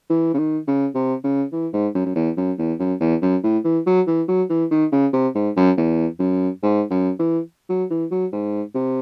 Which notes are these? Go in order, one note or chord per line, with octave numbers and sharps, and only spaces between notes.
E3
C#3
D#3
C#3
C3
C#3
E3
G#2
F#2
F#2
E2
F#2
E2
F#2
E2
F#2
A2
E3
F#3
E3
F#3
E3
D#3
C#3
C3
G#2
F#2
E2
F#2
G#2
F#2
E3
F#3
E3
F#3
G#2
C3